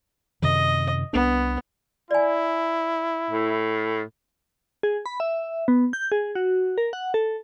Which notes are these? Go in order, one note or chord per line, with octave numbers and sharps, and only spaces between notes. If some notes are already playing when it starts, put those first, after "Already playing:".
F#2 C3 D#3 D#5
C2 B3 D4
E4 D5 G#5
A2
G#4
B5
E5
B3
G6
G#4
F#4
A#4
F#5
A4